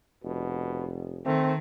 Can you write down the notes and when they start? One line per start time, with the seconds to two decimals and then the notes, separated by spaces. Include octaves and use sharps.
0.24 F1 B2
1.26 D#3 A3 C4